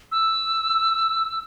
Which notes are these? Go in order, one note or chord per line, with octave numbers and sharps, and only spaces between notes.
E6